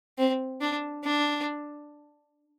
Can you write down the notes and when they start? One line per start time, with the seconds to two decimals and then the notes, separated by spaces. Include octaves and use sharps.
0.18 C4
0.61 D4
1.04 D4